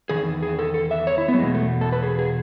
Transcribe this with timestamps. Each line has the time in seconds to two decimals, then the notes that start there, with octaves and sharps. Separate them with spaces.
0.09 E2 D#3 G#4
0.43 G#4
0.59 A4
0.74 A4
0.91 E5
1.07 C#5
1.18 E4
1.28 B3
1.34 F#3
1.38 E2 B2 G#3
1.55 A3
1.81 A4
1.92 B4
2.03 G#4
2.19 G#4